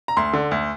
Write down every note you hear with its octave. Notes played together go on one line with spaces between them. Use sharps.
A#5
D2 C6
D3
D2